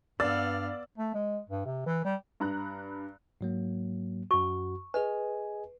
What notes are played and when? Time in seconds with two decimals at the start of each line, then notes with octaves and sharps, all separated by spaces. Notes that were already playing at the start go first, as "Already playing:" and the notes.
0.20 G2 B3 D5 F5 E6 A6
0.98 A3
1.14 G#3
1.49 G2
1.66 C3
1.86 E3
2.04 G3
2.40 G2 A#5 F#6
3.41 G#2 F#3 A#3
4.31 F#2 F#4 C#6
4.94 G#4 B4 D#5 G#5